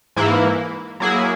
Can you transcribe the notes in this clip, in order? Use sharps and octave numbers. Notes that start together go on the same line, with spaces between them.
G#2 E3 A#3 E4
F#3 A#3 E4 G#4